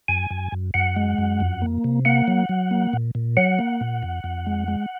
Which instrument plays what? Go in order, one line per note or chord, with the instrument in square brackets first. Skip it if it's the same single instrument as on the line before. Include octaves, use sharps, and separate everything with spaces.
[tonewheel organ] F#2 G#5
F#2
F#2
F#2 F#5
G#3
F#2
F2
A#3
C3
A#3 F#5
F#3
F#3
A#3
A#2
A#2
F#3 F#5
A#3
A#2
F2
F2
G#3
G#3